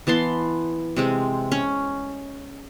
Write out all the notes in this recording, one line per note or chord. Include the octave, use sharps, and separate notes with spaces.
E3 B3 A5 C6
C3 G#3 C4
C#4